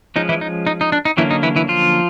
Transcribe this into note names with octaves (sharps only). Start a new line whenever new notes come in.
F3 G#3 C#4 D#4
E3 E4
D#4
D#4
D#4
D4
D#4
D3 E3 F#3 A#3 C#4 E4
D#4
E3 E4
E3 E4
F3 F4